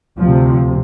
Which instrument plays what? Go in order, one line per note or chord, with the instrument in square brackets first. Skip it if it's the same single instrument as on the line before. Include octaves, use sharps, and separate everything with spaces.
[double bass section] D2 C3 F3